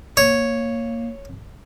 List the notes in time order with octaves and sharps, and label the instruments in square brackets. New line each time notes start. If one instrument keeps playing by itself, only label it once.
[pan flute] A#3 [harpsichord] C#5